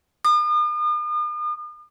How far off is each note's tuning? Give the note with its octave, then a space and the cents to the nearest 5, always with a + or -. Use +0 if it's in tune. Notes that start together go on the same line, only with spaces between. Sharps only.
D#6 -45